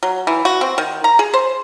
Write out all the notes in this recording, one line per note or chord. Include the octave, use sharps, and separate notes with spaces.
F#3
E3
F#4
C4
D#3
A#5
G#4
C5